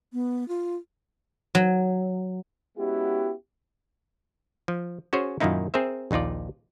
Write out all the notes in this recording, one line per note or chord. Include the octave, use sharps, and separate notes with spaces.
B3
F4
F#3
G#3 B3 C#4 E4 F#4 G4
F3
C#4 F#4 G#4 C5 C#5
F#2 A#2 D#3 A#3 D#4 E4
C4 G#4 A#4 C5 E5
A#1 D#2 D#4 F4 D5